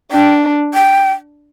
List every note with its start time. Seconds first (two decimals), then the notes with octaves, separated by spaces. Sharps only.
0.12 D4 G5
0.74 G5